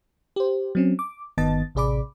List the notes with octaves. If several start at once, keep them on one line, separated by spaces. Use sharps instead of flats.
G4 C5
F#3 C4 C#4
D6
G1 D#3 B3 D#5 A5 A6
A1 C3 G#4 D5 B5 D6